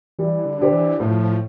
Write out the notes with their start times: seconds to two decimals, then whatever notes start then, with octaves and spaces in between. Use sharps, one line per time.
0.19 E3 G3
0.45 D3
0.58 D4 G4 C5
0.72 E3
1.00 A2 F3